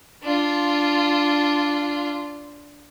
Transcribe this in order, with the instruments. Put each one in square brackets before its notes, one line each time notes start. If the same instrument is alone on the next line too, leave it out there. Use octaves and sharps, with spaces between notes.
[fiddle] D4 F4